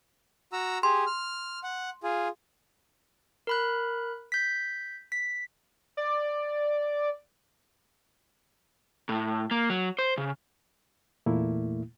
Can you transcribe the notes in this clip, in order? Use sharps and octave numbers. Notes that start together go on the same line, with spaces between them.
F#4 A#5 E6
G4 G#4 C6
F6
F#5
F4 G#4
A#4 B5 F#6
G6 B6
B6
D5
A2
A#3
F#3
C5
C#3
E2 A#2 A3 A#3 E4